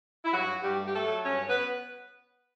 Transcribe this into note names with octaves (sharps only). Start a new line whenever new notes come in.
E4
G2 F#3 F#4
G2
G3 G4
A3
G4
A3 A4
F#3
G2 C#4 C#5
B3 B4